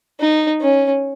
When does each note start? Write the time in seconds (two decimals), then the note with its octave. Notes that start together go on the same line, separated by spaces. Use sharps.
0.20 D#4
0.61 C#4